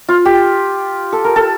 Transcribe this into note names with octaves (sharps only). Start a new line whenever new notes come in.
F4
G4
A4
A#4
A4